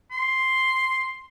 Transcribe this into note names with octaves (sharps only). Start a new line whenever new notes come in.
C6